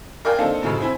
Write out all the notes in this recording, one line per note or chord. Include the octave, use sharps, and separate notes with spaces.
A#4 D5 F5 G5 G#5
A#3 C4 D4 D#4 F4 A4
F#2 A2 C#3 F3 G#3
C4 E4 G#5